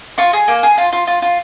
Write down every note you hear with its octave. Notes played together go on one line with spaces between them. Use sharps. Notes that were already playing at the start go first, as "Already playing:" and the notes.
F4 C#6
G#4
A#3
G#4
F4
F4
F4
F4